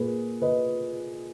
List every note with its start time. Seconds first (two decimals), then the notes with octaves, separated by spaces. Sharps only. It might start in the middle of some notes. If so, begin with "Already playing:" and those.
Already playing: A#2 A#3 G#4 B4
0.42 B4 D#5